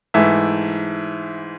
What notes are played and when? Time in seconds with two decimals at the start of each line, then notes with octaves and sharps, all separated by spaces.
0.14 G#2 E3 A3 E5